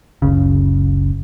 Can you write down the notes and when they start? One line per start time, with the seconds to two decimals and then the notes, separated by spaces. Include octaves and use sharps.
0.22 F#1 C#2 C#3